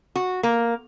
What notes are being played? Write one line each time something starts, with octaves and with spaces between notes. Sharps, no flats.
F#4
A#3